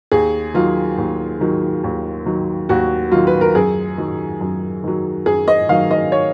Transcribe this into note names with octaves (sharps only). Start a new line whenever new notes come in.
D#2 G#4
D#3 F#3 F4
D#2
D#3 F#3
D#2
D#3 F#3
D#2 F#4
D#3 F#3 F4
B4
A#4
F#2 G#4
D#3 F#3
F#2
D#3 F#3
F#2 G#4
D#5
D#3 F#3 F5
D#5
C#5